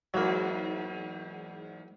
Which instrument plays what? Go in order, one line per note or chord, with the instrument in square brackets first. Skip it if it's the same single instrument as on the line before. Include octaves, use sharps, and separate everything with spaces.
[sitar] E2 G#2 [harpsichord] F#3 A#3